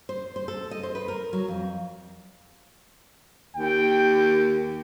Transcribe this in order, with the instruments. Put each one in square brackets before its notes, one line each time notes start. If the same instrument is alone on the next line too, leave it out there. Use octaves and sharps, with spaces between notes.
[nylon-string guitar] C5
C5
A4
D#5
C5
B4
A#4
F#3
F2
[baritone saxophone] D#2 [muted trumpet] G5